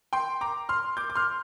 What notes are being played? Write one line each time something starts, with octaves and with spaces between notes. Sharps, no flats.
G5 C6
A#5 D6
C6 F6
D6 G6
D6
C6 F6